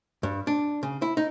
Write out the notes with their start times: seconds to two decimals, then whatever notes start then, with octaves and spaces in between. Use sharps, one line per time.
0.23 G2
0.47 D4
0.83 C#3
1.02 E4
1.17 D#4